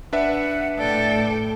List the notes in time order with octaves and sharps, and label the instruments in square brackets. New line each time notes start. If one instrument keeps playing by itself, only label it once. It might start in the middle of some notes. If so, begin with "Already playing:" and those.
[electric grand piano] D4 B4 E5 [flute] F#5
[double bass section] A2 [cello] A4 G5 [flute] D5